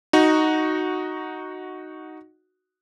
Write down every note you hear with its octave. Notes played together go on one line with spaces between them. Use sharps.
D#4 F#4